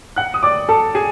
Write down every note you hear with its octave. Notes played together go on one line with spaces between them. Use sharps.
F#5 F#6
D#6
D5 D6
A4 A5
G#4 G#5